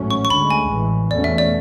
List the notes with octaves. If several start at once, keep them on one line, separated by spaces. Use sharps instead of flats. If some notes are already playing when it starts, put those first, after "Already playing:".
Already playing: A1 G#2 F#3 A3 C#4
C#6
C#6
D2 D3 G#3 B5
G#5
A1 A2 E3
E2 B2 A3 C#4 D5
E5
D5